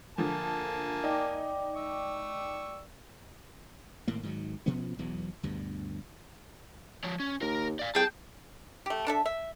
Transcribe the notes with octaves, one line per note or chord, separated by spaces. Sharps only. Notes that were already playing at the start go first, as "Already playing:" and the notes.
D3 F3 A#3 G#5 A5
D#4 D5 G5 D6
C#6 E6
G#1 A2 A#3
G#2 D#3 F#3
B2 F3 B3 C#4
B1 E2 E3 F#3
D2 G2 B2
F3 C#5
C#4
D#2 A#4 A#5
D5 F5
C2 G#4 G5 A5
A3 G4
D4 A4 E5
E5